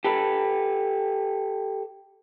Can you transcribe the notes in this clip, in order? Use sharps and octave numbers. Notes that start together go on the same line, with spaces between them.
G4 A4 B4